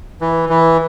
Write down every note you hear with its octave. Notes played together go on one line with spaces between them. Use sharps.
E3
E3